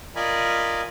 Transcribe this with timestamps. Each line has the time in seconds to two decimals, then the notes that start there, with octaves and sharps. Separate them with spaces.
0.16 F4 A#4 D5 D#5 G#5 B5